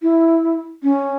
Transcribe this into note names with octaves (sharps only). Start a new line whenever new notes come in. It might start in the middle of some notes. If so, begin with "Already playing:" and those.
E4
C#4